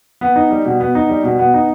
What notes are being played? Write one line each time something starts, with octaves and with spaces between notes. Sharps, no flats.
B3
D#4
G3
B2
B3
D#4
G3
B2
B3
D#4